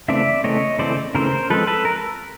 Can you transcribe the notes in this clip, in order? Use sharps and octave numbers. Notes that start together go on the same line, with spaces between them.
C#3 E3 A3 C4 D5 E5
C#3 E3 A3 C4 C#5 D#5
C#3 E3 A3 C4 C5 D5
C#3 E3 A3 C4 A#4 C5
F3 G#3 C4 A4 B4
A4 B4
A#4